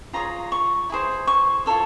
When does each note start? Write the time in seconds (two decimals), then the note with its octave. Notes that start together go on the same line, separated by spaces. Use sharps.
0.13 F4 G#4 C#5 A#5
0.52 C#6
0.90 E4 G#4 C5
1.27 C#6
1.66 F4 A4 C#5